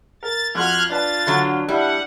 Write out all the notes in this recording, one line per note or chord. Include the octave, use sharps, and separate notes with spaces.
A#4 A6
F2 F4 F#4 C6 F6 F#6 G#6
D4 B4 A5 A6
D3 F#3
G3 D4 E4 F#5